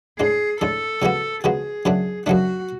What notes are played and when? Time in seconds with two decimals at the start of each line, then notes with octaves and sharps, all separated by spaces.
0.19 A2 G#3 D4 G#4
0.61 A2 G#3 D4 A4
1.02 C#3 F3 G#3 B3 F#4
1.44 C#3 F3 G#3 B3 F#4 G#4
1.85 F#2 C#3 F#3 A3 D4
2.26 F#2 C#3 F#3 A3 D4 F#4